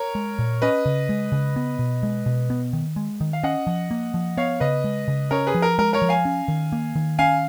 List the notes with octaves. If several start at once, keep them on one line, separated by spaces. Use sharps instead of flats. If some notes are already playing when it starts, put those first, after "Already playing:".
Already playing: A#4 C#5
G#3
A#2
C#4 B4 D#5
C#3
G#3
C#3
B3
B2
G#3
B2
B3
D#3
G#3
D#3
F5
C#4 D#5 F#5
F3
A#3
F3
B3 C#5 F5
C#3 B4 D#5
G#3
C#3
C#4 A#4 C#5
G#4 B4
F3
A#4
G#3 A#4
A#4 C#5
F3
F5 G#5
C#4
D#3
A#3
D#3
C#4 F5 G#5